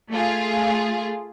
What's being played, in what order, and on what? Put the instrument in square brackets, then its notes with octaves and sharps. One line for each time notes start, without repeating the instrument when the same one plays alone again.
[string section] A3 F4 G#4